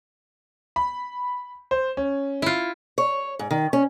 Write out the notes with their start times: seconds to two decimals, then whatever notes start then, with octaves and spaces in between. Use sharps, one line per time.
0.76 B5
1.71 C5
1.97 C#4
2.42 E4 F4
2.98 C#5
3.39 G#2
3.51 D#3
3.73 C#4